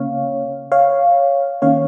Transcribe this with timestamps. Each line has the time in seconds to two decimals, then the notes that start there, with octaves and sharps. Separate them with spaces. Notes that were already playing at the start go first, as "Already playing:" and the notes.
Already playing: C#3 A#3 C#4 C#5 F5
0.72 C#5 F5
1.62 D#3 A#3 C#4 C#5 F5